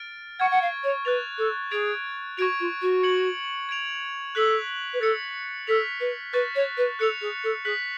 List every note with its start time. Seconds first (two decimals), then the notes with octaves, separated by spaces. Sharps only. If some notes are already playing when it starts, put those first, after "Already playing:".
Already playing: F6 A6 D7
0.39 F#5 C#6 F6 G#6
0.51 F#5
0.62 F5
0.83 C#5
1.05 B4 F#6 A6 F7
1.38 A4
1.72 G#4 G#6 D7 F7
2.37 F#4 C#6 G#6 D7 F7
2.60 F4
2.81 F#4
3.03 G#6 C#7 F#7
3.69 G#6 D7 F7
4.35 A4 F#6 B6 F#7
4.93 B4
5.01 A4 F#6 A6 C#7
5.67 A4 F6 B6 F7
6.00 B4
6.33 B4 C#6 F#6 A6
6.55 C#5
6.77 B4
6.99 A4 F#6 C#7 F7
7.21 G#4
7.44 A4
7.65 G#4 F#6 B6 F#7